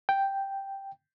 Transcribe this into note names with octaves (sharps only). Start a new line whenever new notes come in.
G5